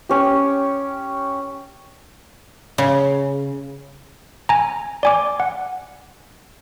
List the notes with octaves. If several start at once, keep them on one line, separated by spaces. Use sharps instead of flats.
C#4 G4
C#3
G#5 A#5
D5 G#5 D6
F#5